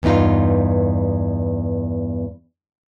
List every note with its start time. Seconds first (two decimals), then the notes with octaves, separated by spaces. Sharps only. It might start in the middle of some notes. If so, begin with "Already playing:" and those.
0.03 E2 G2 B3 D#4 F4